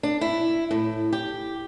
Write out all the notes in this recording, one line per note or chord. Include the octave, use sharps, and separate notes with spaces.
D4
E4
A2
G4